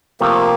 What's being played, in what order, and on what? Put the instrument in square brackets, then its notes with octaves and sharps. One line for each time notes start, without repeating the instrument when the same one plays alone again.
[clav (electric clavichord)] C3 F3 A3 [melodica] A#3